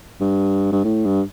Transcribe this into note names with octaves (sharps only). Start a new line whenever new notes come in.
G2
G2
A2
G2